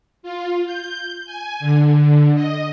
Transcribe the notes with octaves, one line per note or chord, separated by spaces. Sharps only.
F4
G6
G#5
D3
D#5